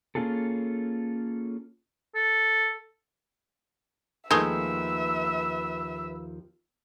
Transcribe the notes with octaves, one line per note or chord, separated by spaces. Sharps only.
A#3 C#4 F4 G#4 A4
A4
D#2 D#3 F3 G#3 A3 B4 E5